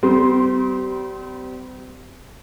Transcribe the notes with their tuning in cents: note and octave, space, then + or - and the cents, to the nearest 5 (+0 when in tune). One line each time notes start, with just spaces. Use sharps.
G3 -30 C4 -45 C6 +5